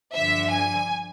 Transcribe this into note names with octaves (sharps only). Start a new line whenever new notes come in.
G2 D3 F3 E5
G#5